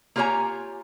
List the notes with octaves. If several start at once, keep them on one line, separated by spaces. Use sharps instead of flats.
A#3 F4 G4 C#5 G#5 A#5